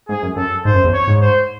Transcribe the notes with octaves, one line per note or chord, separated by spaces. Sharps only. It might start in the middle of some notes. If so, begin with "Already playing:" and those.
G#2 G#4
F#2
F#2 A4
G#2 C5
F#2
E2
C#5
G#2
C5